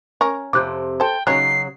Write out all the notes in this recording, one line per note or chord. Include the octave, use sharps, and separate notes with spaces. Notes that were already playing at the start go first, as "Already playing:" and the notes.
C#4 A#4 C#6
F2 C3 D6 F#6 G6
A4 C5 G5
C#3 F#3 C#4 D#4 C#5 F#6 C7